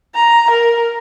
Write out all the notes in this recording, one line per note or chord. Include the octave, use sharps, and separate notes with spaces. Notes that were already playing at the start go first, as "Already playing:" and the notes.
A#5
A#4